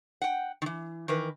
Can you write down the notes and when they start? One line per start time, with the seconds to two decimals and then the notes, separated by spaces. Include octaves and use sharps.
0.22 F#5 G5
0.62 D#3 E3
1.08 D#3 E3 A#4 B4